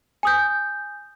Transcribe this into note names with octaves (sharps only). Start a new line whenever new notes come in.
G#5 D#6 G6